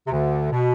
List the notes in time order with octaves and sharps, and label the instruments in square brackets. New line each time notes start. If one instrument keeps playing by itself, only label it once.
[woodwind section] C3
D2 D3
B2